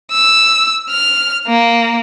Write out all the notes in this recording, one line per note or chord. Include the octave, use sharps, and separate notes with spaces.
E6
F6
A#3